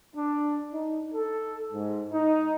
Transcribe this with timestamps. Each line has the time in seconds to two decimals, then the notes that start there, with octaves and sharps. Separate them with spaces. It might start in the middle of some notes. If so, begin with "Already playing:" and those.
0.15 D4
0.72 D#4
1.14 A4
1.72 G#2
2.13 D#4